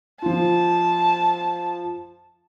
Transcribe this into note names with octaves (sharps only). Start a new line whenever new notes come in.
F3 F4 A5